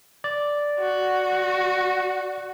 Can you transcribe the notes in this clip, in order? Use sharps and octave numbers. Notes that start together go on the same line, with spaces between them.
D5
F#4